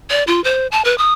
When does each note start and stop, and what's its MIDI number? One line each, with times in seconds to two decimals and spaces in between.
0.10 0.24 74
0.27 0.42 65
0.44 0.67 72
0.71 0.84 81
0.84 0.97 71
0.98 1.13 87